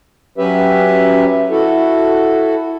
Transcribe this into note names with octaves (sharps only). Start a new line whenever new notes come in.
F#3 C#4 G4 B4 E5
E4 F#4 A4